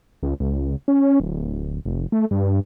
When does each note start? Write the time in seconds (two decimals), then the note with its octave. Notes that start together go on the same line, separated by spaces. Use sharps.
0.23 C#2
0.40 C#2
0.88 C#4
1.20 D1
1.86 F1
2.12 A3
2.31 G2